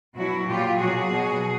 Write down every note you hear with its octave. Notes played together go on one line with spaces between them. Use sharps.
B2 F#3 E4 F#4
A#2 F#3 F4 G4
B2 F#3 F#4 G#4
B2 F#3